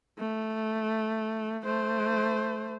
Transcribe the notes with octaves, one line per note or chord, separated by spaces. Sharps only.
A3
A3 C5